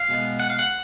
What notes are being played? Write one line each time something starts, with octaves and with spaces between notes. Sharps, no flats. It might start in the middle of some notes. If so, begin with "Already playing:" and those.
Already playing: F5
B2 G#3 B3
F#5
F5
F#5